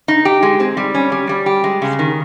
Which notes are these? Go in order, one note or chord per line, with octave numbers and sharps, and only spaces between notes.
D#4
G4
G#3
C4
G3
C#4
G3
G3
G4
G#3
C#3
D#3